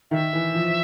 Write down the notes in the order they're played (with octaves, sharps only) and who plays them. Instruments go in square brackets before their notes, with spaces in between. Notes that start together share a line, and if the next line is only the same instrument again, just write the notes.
[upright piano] D#3 [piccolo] E5
[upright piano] E3
F3